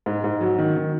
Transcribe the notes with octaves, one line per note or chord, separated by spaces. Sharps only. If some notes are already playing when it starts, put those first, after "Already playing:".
G#2
G#2
F#3
D#3
D#3